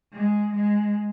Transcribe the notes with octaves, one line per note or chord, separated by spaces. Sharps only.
G#3
G#3